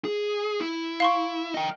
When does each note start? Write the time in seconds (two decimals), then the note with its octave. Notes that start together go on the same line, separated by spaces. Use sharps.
0.05 G#4
0.60 E4
1.00 F5 C6 C#6
1.54 D#5 G5